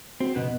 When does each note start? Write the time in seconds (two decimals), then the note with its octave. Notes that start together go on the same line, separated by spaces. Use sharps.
0.20 C4 F#4
0.36 B2 B3